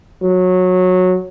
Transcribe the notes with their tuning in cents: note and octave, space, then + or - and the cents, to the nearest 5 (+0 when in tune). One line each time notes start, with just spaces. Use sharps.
F#3 -15